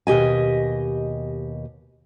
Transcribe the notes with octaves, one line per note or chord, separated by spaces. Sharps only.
D#2 B2 G4 D#5 G#5